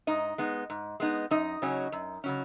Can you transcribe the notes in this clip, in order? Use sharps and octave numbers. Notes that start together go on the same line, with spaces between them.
G#2 D#4 D#5
G#3 B3 D#4
G#2
G#3 B3 D#4
F#2 D#4 D#5
C#3 F#3 C#4
F#2
C#3 F#3 C#4